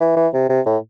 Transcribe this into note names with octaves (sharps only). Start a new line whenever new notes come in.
E3
E3
C3
C3
A2